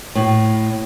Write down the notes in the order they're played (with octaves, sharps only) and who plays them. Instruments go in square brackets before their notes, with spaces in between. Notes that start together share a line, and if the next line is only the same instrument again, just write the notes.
[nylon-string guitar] A2